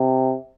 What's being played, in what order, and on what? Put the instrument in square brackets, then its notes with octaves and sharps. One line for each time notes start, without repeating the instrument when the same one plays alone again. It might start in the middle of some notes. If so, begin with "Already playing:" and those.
Already playing: [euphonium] C3